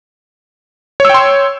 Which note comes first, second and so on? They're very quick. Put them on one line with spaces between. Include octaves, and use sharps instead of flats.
C#5 E6 G5 C6